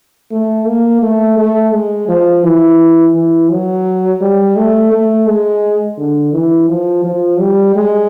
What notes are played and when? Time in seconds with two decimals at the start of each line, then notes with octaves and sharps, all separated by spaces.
0.31 A3
0.67 A#3
1.02 A3
1.38 A3
1.73 G#3
2.08 F3
2.43 E3
3.14 E3
3.50 F#3
4.21 G3
4.56 A3
4.92 A3
5.27 G#3
5.98 D3
6.33 E3
6.69 F3
7.04 F3
7.40 G3
7.76 G#3